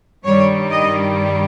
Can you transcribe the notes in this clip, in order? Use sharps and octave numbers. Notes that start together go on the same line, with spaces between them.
G2 D#3 G3 C#5
D#5